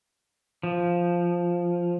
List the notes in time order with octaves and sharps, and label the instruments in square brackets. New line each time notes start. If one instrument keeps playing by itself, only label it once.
[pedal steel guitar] F3